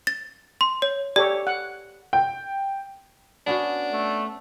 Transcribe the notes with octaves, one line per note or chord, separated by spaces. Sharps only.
A6
C6
C#5
G4 A4 C#5 D5
F#5
G5
B3 C#4 D4 F#4
A3